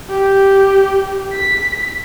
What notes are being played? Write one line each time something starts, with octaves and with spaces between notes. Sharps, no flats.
G4
B6